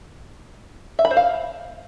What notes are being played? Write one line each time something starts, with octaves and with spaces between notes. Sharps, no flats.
E5
B5
C5
F5